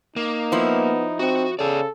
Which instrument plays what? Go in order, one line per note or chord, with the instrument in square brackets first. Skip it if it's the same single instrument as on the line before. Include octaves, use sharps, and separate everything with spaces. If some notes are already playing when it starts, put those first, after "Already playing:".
[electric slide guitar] A#3 [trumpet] D#4
[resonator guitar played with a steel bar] F3 E4 [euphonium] B3
[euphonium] C4 [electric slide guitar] F#4
[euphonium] C#3 [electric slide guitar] G#4 D5 [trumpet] A4